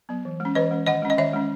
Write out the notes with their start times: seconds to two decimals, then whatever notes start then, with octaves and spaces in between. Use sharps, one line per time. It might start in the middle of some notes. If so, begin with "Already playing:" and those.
0.09 F#3 B3
0.25 E3
0.40 G#3
0.45 C#4
0.55 E3 B4 D#5
0.71 G#3 C#4
0.86 D#3 D#5 F#5
1.02 G#3 C#4
1.10 D#5
1.18 D#3 C#5 E5
1.34 G#3 C#4